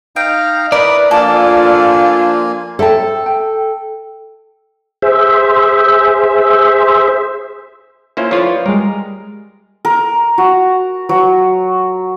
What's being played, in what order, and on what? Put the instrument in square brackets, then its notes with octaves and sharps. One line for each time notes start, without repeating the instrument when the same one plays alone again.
[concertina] D#4 F5 A#5 [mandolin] G5
[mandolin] E4 A#4 [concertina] B4 D#6 F#6 [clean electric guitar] D5
[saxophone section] F3 D4 F4 [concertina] A#3 G#5 [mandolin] A4
[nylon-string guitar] A4 A5 [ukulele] C5 E5 G5
[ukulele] G5
[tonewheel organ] G#4 C5 E5
[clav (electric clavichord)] A#3 C#4 C5 [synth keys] E4 F4
[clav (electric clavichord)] F3 A3 F4 [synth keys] B4 C#5 D5
[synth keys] G3 G#3 [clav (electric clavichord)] A#4
[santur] A#4
F#4
F#3